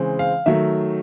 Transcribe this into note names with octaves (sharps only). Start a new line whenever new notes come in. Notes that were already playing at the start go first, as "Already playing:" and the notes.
Already playing: C#3 E3 G#3 C4
F5
D#3 F#3 A3 E5